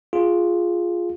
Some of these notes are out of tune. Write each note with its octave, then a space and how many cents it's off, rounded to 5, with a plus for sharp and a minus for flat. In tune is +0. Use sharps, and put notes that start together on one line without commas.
F4 +0 G#4 +0